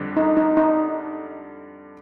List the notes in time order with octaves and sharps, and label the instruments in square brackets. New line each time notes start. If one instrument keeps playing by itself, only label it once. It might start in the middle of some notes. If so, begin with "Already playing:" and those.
Already playing: [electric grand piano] F2 D3 G3 D4
[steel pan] D#4
D#4
D#4